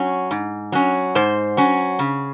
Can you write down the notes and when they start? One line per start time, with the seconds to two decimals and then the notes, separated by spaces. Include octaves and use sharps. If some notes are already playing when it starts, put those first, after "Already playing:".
Already playing: F#3 C#4
0.31 G#2
0.72 F#3 C#4
1.15 G#2 C5
1.57 F#3 C#4
1.99 C#3